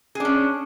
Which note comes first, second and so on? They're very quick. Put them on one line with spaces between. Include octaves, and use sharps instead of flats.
G#4 D4 C#4